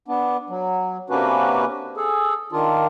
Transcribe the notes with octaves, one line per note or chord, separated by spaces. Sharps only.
B3 D4
F#3
C3 A#3 C#4 D4 F#4 B4
G#4 A4
D#3 D4 F4